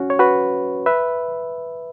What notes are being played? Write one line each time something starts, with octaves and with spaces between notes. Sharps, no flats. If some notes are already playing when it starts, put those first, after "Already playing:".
Already playing: C#4 F#4
C#5
F#4 B4
B4 E5